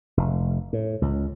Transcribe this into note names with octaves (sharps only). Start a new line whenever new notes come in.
F1
A2
C#2